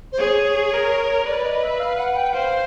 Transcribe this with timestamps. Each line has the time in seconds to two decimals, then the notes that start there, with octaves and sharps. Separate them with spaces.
0.12 C5
0.19 G#4 C#5
0.73 A#4
1.26 B4 D5
1.44 D#5
1.63 E5
1.79 F5
1.98 F#5
2.16 G5
2.33 C5 F5